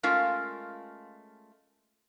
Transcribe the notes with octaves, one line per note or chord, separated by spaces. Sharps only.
G#3 A3 C#4 F4 A#4 F5